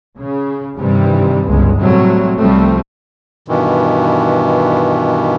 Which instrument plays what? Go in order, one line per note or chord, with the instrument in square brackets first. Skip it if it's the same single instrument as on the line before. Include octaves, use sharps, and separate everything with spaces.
[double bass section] C#3
G2 C3 D#3 E3 G3
G1 C#2 G2 G#3
A2 C3 F#3 G3 A3
C2 F3 G3 A3 C4
[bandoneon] G2 B2 D#3 E3